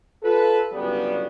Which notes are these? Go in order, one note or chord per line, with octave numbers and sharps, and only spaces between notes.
F4 A4 B4
G1 C#3 F#3 G3 B3